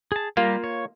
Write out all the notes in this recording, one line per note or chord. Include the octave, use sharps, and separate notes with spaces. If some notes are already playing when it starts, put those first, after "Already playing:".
G#4 A5
G3 A#3 F4 G4 A#4
C#5